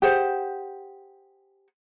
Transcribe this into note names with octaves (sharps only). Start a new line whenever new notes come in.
G4 G#4 C5 F#5